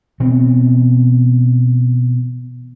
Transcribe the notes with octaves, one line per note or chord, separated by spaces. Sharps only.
B2 E3 C4